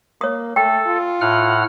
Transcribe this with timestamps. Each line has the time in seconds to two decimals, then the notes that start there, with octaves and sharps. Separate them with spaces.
0.21 A#3 C#5 D#6
0.56 A3 A4 G5
0.86 F4
1.21 A2 F#5 F6